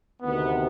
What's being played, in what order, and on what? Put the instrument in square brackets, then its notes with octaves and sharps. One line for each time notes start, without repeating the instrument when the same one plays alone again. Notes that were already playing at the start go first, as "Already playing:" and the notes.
[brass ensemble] D2 C3 D#3 B3